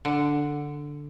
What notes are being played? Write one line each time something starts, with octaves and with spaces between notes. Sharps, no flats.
D3